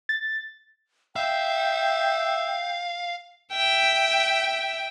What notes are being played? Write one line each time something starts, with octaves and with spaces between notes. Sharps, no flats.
A6
E5 F5 G5
E5 G5